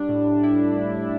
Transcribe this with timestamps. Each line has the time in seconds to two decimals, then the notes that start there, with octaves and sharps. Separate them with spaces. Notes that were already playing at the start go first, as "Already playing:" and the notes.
Already playing: G3 D4
0.09 A2
0.43 G3 E4
0.77 A2